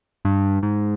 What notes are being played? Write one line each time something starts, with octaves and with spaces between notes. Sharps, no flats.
G2
G#2